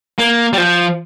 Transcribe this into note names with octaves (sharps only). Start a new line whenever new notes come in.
A#3
G3
F3